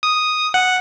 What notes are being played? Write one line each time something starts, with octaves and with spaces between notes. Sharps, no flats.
D#6
F#5